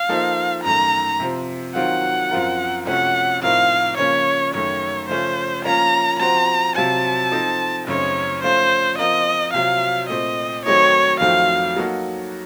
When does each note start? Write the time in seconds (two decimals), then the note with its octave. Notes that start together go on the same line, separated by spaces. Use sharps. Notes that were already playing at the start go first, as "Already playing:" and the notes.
Already playing: F5
0.09 F3 A#3 D#4 A4 C5
0.64 F#2 D#3 A3 A#5
1.20 C3 F3 C4
1.75 D#3 F#3 C4 F4 F#5
2.31 F#2 F3 C4 F4 A#4
2.87 C3 F3 A3 C#4 F#4 F#5
3.42 A2 F3 C4 D#4 A#4 F5
3.97 C#3 F3 A#3 C#4 C#5
4.53 F#2 D#3 A3 C#5
5.09 C#3 F3 A3 C#4 C5
5.65 F3 A#3 C#4 F4 A#4 A#5
6.20 F3 C4 F#4 C5 A#5
6.75 C3 F#3 C4 F4 C5 A5
7.31 F3 C4 D#4 A4 C5
7.87 F#2 C#3 A3 C4 D#4 C#5
8.43 F3 A3 C#4 F4 C5
8.99 F3 C4 F4 A#4 D#5
9.54 C3 F#3 C4 F4 F5
10.10 A#2 A3 C4 D#5
10.66 D#3 F#3 A3 C4 D#4 C#5
11.20 F2 D#3 F#3 A3 C4 F5
11.76 F#3 A#3 D#4 F#4 A4